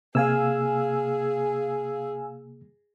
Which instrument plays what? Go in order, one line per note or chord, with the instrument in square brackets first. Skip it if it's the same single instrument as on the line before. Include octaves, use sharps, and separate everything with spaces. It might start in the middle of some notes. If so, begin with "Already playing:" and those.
[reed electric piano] C3 A#3 [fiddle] G#4 [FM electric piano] F5 G#5 E6